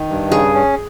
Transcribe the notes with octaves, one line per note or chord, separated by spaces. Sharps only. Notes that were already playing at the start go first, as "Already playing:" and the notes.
Already playing: D#3
G2
C#3 G#4
C#4